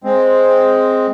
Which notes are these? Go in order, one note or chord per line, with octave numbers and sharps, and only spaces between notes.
G#3 C4